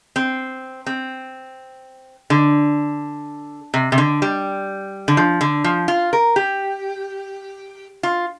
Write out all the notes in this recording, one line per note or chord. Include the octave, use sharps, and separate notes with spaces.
C4
C4
D3
C3
C3
D3
G3
D3
F3
D3
F3
F4
A#4
G4
F4